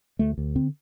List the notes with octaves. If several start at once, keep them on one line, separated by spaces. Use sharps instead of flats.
D2 A3
D2
D3 C4